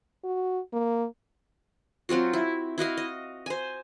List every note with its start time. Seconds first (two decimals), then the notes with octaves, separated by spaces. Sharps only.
0.24 F#4
0.73 A#3
2.09 F#3 C4 F4 F#4
2.33 E4
2.78 E4 F#4 D#5 F5
2.97 D#5
3.46 C5 G#5